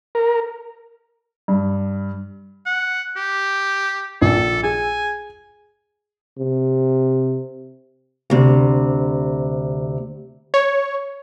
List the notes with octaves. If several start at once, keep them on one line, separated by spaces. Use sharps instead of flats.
A#4
G2
F#5
G4
A#1 A4
G#4 G#5
C3
D2 C3
C#5